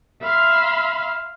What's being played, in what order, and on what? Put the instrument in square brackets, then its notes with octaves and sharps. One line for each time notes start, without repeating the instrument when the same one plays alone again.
[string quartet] E5 F5 B5 C6